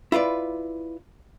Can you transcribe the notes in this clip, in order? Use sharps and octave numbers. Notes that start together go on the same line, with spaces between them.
E4 F4 B4 D5